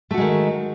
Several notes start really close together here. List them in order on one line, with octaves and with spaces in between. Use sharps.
A3 F#4 G#3 D#3